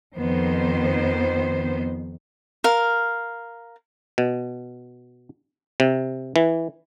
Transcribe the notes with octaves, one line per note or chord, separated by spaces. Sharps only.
F2 D#3 B3 C5
A#4 F5
B2
C3
E3